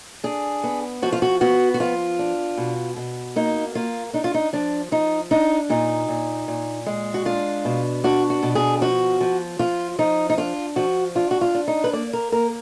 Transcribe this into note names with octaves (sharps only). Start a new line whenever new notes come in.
D4 G#4
B3
F3 F#4
F4
F#4
B3 F#4
F#4
F3 F4
D4
B2
B2
A#3 D#4
A#3 F4
D4 D#4
F4
D#4
F3 D4
F3 D#4
D4 D#4
A#2 D#4
A#2
A#2
G#3
F#4
D4 F4
B2
D4 F#4
F#4
B2
G#4
F3 F#4
F3
F3 F4
F3 D#4
D#4
D4 F4
F3 F#4
D4 F4
F#4
F4
D4
D#4
B4
A#3 D5
A#4
A#3 A#4